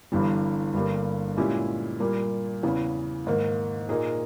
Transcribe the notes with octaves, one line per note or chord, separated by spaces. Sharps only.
G1 G2 E3 G3
G1 G2 G3 A#3
A#2 G#3 C#4 E4 G4
A#2 G3 A#3
E2 C#3 E3
G#2 D#3 A#3
A#2 A#3 D#4 G#4